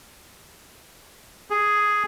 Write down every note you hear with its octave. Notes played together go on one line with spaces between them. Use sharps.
G#4